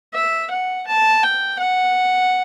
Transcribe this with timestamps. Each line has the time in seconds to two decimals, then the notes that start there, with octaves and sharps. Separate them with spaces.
0.14 E5
0.51 F#5
0.87 A5
1.23 G5
1.59 F#5